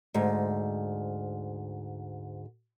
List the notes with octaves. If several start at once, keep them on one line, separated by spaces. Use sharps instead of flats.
D2 G#2